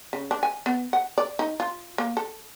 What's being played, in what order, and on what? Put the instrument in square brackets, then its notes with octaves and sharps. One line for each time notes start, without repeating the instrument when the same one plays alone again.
[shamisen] C#3
D4
G#5
B3
F#5
D5
D#4
F4
A#3
A4